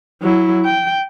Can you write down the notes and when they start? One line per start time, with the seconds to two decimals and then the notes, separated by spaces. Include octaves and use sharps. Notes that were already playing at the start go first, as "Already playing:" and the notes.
0.22 F#3 E4
0.65 G5